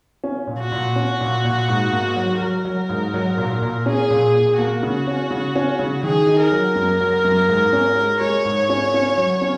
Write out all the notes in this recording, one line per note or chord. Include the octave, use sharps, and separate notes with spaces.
C#4
A#2
F#4
A#2
C#4
A#2
A#2
G#2
A#3
F#3
F#3 A#4
F#3
G#2
F#3
A#2
A#2
C#4 G#4
A#2
A#2
A#3 F#4
C#3
C#4
C#3
C#4
C#3
D#3 G#4
D#4
A#4
F#3
F#2
F#3
F#2
G#2
C#4
G#3
G#3 C#5
G#2
C#4
C#4
F#3
C#4